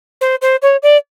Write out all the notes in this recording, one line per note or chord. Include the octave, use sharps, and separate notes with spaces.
C5
C5
C#5
D5